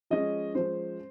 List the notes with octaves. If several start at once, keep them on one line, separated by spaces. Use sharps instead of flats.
F3 G#3 C#4 D#5
F3 G#3 C#4 C5